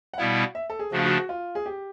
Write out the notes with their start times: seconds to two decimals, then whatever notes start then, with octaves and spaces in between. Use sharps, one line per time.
0.13 F#5
0.18 B2 G3 B3 E4 F5
0.55 E5
0.70 A4
0.79 G#4
0.92 C#3 F3 A3 D4 F#4
0.99 F4
1.06 F#4
1.29 F4
1.55 G#4
1.66 G4